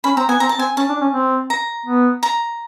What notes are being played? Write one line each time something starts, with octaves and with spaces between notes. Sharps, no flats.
C#4 B5
C4 A#5
B3 G#5
C4 A#5
A5
C4 G#5
C#4 A5
D4
C#4
C4
A#5
B3
A#5